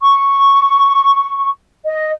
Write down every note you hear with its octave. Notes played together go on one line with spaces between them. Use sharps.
C#6
D#5